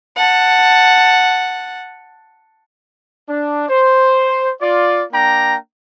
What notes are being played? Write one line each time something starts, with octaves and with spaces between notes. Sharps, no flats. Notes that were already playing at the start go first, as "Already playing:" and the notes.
F#5 A5
D4
C5
F4 D5
A#3 D4 G5 A#5